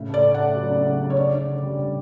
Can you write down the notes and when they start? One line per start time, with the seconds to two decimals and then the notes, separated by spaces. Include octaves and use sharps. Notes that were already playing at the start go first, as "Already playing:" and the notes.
Already playing: A2 C#3
0.09 A3 D5
0.24 A3
0.34 F#5
0.39 A3
0.55 F#3
0.71 C#3
0.86 C#3
1.01 C#3
1.10 C#5
1.17 D3 D5
1.32 D3
1.48 D3
1.63 G3
1.79 G3